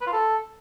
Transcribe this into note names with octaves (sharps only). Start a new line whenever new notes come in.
B4
F4
A4